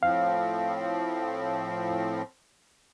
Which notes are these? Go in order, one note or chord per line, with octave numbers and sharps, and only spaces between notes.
A2 F3 C4 F5